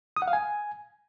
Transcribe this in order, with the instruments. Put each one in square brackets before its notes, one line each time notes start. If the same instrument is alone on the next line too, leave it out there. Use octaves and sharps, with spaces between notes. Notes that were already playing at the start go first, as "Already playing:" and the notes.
[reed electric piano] D#6
F#5
F5
G#5